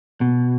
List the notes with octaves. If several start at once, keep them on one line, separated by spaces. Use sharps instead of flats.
B2